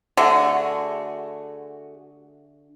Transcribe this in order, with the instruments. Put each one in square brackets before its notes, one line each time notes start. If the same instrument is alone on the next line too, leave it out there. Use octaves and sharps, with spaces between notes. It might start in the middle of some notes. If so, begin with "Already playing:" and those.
[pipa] D3 [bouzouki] A3 F#4 G#4